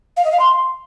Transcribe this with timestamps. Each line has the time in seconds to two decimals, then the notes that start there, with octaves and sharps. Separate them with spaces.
0.16 F5
0.24 D#5
0.31 F5
0.39 C6